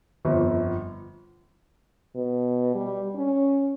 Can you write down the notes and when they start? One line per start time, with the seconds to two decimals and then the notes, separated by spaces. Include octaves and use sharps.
0.25 G1 F2
2.15 B2
2.74 G3
3.16 C#4